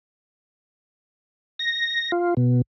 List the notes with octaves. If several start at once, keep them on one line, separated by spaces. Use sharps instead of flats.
A#6
F4
B2